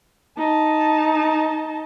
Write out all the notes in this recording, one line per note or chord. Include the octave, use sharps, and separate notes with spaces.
D#4 A5